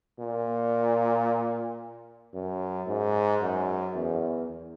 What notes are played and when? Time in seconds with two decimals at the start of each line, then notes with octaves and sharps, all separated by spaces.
0.19 A#2
2.34 F#2
2.88 G#2
3.42 F#2
3.96 E2